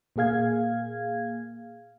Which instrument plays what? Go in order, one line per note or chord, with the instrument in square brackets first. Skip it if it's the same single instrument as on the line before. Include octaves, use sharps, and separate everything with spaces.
[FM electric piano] A#2 A#3 G#4 F5 G#6